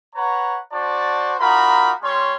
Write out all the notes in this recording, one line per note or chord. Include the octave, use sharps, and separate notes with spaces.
B4 C#5 F#5 A#5
D4 F#4 C5 D5 A5
D#4 F4 F#4 A#4 B5
G3 C#4 C#5 C6